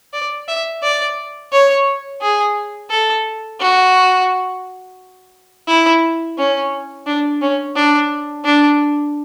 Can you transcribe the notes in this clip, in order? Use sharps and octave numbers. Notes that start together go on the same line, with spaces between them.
D5
E5
D5
C#5
G#4
A4
F#4
E4
C#4
D4
C#4
D4
D4